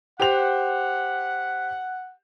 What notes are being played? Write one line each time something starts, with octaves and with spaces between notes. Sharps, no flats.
G4 C5 F#5 F7